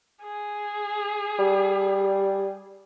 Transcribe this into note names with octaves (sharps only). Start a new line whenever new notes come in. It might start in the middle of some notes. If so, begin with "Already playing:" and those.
G#4
G3